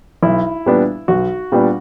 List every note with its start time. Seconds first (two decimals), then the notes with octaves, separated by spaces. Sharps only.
0.23 B1 E4
0.66 A#2 G3 B3 D4
1.08 B1 F#4
1.52 A#2 G3 B3 D4